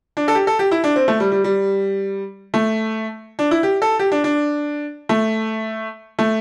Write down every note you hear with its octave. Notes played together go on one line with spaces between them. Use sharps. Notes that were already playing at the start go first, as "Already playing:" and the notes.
D4
A4
G4
A4
G4
E4
D4
C4
A3
G3
G3
G3
A3
D4
E4
G4
A4
G4
D4
D4
A3
A3